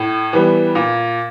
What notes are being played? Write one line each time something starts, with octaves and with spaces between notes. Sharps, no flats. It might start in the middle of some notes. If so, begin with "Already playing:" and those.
Already playing: A2
E3 G3 B3
A#2